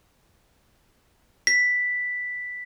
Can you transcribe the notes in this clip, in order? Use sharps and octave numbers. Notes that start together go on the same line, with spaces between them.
B6